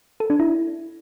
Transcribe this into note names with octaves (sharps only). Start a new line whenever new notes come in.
A4
D4
E4